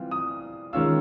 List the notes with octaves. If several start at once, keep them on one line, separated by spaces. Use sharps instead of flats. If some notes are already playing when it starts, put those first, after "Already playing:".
Already playing: E3 G3 C4 F4
D#6
D#3 G#3 C#4 F4 E6